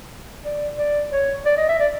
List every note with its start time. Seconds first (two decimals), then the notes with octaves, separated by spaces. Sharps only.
0.44 D5
0.78 D5
1.11 C#5
1.45 D5
1.57 D#5
1.68 E5
1.80 D5